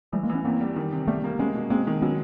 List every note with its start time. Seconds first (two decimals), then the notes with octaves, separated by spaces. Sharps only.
0.13 E3 G3 A3
0.23 G#3 A#3
0.29 E3 B3 C#4
0.44 E2 A#3 C4
0.61 G3
0.76 D#3
0.92 C3
1.07 G3 A3 B3
1.24 A#3
1.39 G#3 B3 C#4
1.55 B2
1.70 G#3 A#3 C4
1.87 D#3
2.02 F#3 B3 C#4